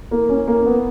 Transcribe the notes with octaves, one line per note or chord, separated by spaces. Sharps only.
A#3
C#4
A#3
B3